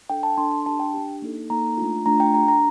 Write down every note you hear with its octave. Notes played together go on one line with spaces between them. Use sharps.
D4 A4 G5
A5
D4 A4 C6
C6
D4 G4 A5
G5
D4 G4
A#3 D#4 A4
A#3 D#4 A4 A#5
A3 D4 F4
A3 D4 F4 A#5
G5
D4 G4 A#5
A#5